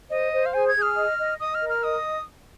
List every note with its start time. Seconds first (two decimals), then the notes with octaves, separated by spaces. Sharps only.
0.10 C5 D#5
0.32 C5
0.46 F5
0.54 G#4 G#5
0.68 G#6
0.75 G#4
0.82 F6
0.96 D#5
1.19 D#5
1.40 D#5 D#6
1.55 F6
1.62 A#4
1.69 F6
1.84 D#5 D#6